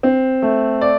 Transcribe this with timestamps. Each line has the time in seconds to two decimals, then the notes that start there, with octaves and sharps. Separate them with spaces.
0.03 C4
0.42 A3
0.81 D5